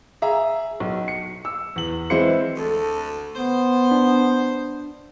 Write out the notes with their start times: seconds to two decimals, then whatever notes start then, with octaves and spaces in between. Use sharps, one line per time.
0.22 G#4 E5 A#5
0.80 B1
1.08 C#7
1.45 E6
1.76 E2 F#7
2.10 E3 G#3 C4 E4 C5 C#7
2.56 D2 A4
3.36 B3 C5
3.91 D4